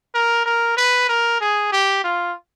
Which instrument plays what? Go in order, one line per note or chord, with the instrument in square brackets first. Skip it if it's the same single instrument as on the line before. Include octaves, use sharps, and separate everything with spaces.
[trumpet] A#4
A#4
B4
A#4
G#4
G4
F4